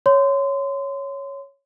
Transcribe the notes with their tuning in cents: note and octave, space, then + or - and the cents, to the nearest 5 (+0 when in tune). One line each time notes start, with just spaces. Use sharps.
C#5 +0 C6 -25